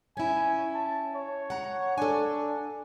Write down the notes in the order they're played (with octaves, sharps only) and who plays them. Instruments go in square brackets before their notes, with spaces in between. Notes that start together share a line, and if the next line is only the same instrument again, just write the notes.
[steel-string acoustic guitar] C#4 E4 [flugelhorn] G#5
[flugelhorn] A5
C#5
[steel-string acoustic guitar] F#5 A#5
[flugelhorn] D4 [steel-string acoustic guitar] A4 G#5